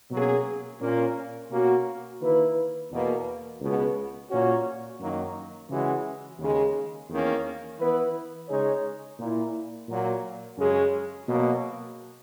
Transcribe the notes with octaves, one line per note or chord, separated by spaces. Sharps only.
B2 F#3 A#3 C#4 G#4
A#2 A#3 C#4
B2 A#3 C#4 F#4
D#3 A#3 E4 B4
E2 B2 A#3
C#2 B2 G#3 B3
A#2 A#3 C#4 F#4 C#5
F#2 D#3 F#3 A#3 D#4
C#3 E3 G#3 C#4 F#4
D#2 C#3 G#3
E2 D#3 A#3 C#4
E3 B3 E4 B4
C#3 G#3 D#4 G#4 C#5
A#2 A#3 E4
A#2 F#3 A#3
F#2 C#3 G#3 C#4 G#4
B2 F#3 A#3